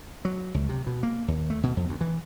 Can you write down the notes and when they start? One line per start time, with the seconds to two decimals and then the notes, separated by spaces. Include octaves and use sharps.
0.25 F#3
0.54 C#2
0.69 C3
0.86 B2
1.03 A#3
1.28 D#2
1.50 A3
1.63 B2
1.77 F2
1.89 D2
2.01 E3